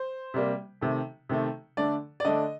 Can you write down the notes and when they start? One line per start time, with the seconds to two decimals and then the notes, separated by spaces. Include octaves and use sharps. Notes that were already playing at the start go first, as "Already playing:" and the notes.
Already playing: C5
0.34 C3 G3 A#3
0.81 C3 D#3 A3
1.29 C3 D#3 A3
1.77 D3 A3 D4 D5
2.20 D5
2.25 D3 A3 D4 D#5